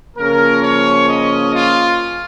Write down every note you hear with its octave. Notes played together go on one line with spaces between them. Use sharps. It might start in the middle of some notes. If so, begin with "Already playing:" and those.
C#3 F3 A#3 C#4 A#4
C#5
D#5
F4